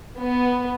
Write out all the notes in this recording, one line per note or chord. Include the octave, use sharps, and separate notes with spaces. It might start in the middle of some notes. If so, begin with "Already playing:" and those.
B3